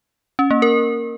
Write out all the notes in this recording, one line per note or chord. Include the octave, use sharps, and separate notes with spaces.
C#4
A#3
A#4